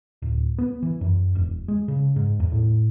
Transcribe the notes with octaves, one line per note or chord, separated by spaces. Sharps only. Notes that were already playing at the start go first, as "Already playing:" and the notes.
D1
B3
E3
F#2
E1
G#3
C#3
G#2
E2
A2